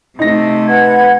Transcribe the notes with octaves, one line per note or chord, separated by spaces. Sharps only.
C3 A3 D#4 A#6
B4 F#5 G#6